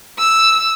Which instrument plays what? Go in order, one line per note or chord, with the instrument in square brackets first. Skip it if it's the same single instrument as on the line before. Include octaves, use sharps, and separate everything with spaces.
[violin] E6